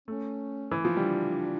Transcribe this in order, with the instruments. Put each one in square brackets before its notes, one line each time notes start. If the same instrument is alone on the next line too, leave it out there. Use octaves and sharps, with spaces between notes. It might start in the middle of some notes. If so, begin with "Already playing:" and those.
[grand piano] A3 [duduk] C#4
[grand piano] E3
F3
[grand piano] G3 [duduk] D4